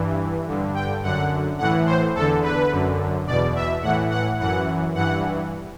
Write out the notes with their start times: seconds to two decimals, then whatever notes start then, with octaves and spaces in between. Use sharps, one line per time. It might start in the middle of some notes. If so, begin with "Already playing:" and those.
Already playing: G2 E3
0.47 G2 D3
0.75 G5
1.03 F#2 D3 F#5
1.59 A2 E3 F#5
1.86 C5
2.14 E2 A4
2.19 D3
2.43 B4
2.71 F#2 D3
3.27 E2 B2 D5
3.56 E5
3.83 A2 E3 F#5
4.11 F#5
4.39 F#2 E3 F#5
4.95 G2 E3 F#5